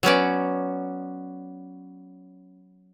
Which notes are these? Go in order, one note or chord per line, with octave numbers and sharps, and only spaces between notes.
F#3 B3 C#4 D5